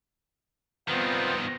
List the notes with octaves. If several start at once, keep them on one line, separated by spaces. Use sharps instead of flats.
G2 D#3 B3 C4 F4